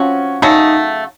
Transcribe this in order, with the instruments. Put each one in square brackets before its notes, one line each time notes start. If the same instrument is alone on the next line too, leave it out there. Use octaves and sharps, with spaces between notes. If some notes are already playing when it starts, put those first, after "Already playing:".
Already playing: [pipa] F3 C4 F#4 [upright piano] C#4
[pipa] C#3 F#3 A3 [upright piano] D#4